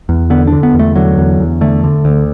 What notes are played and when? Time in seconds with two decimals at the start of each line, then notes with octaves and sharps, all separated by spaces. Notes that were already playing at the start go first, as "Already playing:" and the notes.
0.09 E2
0.30 D3 B3
0.47 D3 D4
0.63 B3
0.74 E2
0.79 A3
0.96 D3 F#3
1.18 E2
1.40 E2
1.61 D3 A3
1.84 D3
2.05 D2